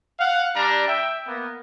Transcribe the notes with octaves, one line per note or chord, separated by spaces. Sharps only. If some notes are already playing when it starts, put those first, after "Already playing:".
F5 F#5
G3 D4 A#5
E5 G5
A#3 B3